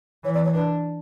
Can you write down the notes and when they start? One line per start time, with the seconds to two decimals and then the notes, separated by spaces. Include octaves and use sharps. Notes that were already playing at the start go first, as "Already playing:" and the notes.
0.24 E3 C#5
0.33 D5
0.44 C#5
0.53 D4 B4